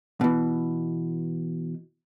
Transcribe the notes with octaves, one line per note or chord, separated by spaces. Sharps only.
B2 E3